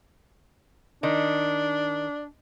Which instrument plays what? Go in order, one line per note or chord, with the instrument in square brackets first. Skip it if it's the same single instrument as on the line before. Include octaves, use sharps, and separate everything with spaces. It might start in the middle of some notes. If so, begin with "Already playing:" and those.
[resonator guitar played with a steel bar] D#3 [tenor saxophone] D4